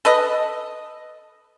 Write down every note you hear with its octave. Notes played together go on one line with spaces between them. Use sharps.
A4 B4 D#5